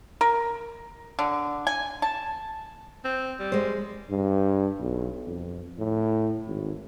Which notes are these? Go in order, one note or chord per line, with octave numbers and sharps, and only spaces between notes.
A#4
D3
G#5
A5
C4
G3
G#3 C5
G2
B1
F2
A2
G#1